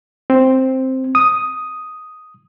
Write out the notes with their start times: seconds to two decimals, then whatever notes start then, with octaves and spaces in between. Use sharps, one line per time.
0.30 C4
1.15 D#6